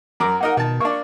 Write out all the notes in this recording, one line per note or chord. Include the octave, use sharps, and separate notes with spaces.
F#2 A#4 A#5 D6
A#3 D#4 A#4 F#5
B2 D#3 A5
A#3 D4 C#6